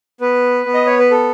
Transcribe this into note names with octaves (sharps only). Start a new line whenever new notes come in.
B3 B4
B3
D#5
C#5
B4
A4